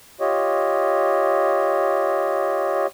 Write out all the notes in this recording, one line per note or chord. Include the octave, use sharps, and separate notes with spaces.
F4 G4 C#5 D#5